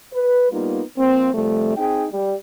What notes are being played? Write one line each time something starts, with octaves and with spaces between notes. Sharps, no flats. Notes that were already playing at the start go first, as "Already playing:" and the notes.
B4
G3 A#3 B3 D#4 F4
F3 A#3 C4
C3 F3 G3 A3
C4 D#4 G#4 G5
G3